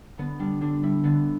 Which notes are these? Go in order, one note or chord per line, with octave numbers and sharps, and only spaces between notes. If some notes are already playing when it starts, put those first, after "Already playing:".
D3 B3
G3 D4
D3 D4
G3 E4
D3 B3